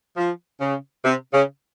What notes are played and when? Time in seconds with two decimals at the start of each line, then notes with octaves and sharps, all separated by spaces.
0.17 F3
0.60 C#3
1.04 C3
1.34 C#3